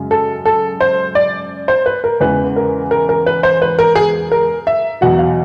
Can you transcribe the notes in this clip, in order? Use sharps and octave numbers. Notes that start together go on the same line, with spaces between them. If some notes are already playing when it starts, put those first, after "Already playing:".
Already playing: F#2 C#3 G#3
A4
A4
C5
D5
C5
B4
A#4
E2 C#3 E3 G#3 B4
A#4
A#4
A#4
B4
C5
B4
A#4
G#4
A#4
E5
E2 B2 F#3 F#5
F5